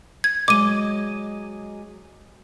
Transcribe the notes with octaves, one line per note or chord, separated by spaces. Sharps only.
G#6
F#3 G#3 D#5 D6 D#7